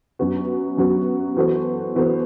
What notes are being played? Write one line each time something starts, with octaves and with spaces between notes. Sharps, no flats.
F#2 F#3 B3 F#4
F#2 F#3 B3 F#4
E3 B3 F#4 A4 C5
E3 B3 F#4 A4 C5